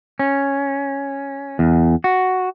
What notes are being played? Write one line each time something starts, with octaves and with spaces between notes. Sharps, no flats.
C#4
E2
F#4